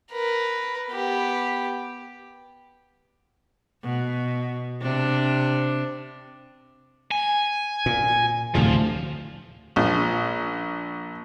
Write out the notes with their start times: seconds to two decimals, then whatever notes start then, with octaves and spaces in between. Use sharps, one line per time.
0.12 A#4 B4
0.90 B3 G4
3.83 B2
4.81 C3 D4
7.11 G#5
7.86 A#2
8.55 D2 A2 C3 F3
9.76 A#1